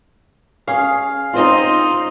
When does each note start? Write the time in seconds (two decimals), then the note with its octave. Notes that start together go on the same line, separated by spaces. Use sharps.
0.67 C#4 G#4 F5
1.33 C4 D#4 F4 C5 D#5